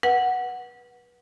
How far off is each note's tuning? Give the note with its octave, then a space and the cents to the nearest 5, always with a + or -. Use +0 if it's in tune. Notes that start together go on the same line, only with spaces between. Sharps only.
B4 -25 F#5 +0